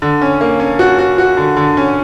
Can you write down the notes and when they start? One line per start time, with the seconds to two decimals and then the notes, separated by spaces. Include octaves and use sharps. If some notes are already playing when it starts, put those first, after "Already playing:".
0.02 D3
0.21 C#4
0.41 A#3
0.60 C#4
0.79 F#4
0.98 F#4
1.18 F#4
1.37 D3
1.57 D3
1.77 C#4